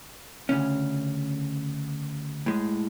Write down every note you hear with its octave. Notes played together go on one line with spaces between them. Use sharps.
D2 A#2 C#3 C#4
A2 G#3